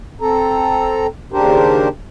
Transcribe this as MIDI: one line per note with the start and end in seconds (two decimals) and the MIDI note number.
0.21 1.07 60
0.21 1.07 69
0.21 1.07 82
1.32 1.88 39
1.32 1.88 49
1.32 1.88 62
1.32 1.88 67
1.32 1.88 70
1.32 1.88 72